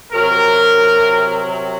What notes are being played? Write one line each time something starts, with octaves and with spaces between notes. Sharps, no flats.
C3 F#3 A#4